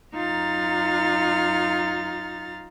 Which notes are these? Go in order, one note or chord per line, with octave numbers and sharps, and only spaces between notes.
F#2 D#4 F4 A#5 F6 A6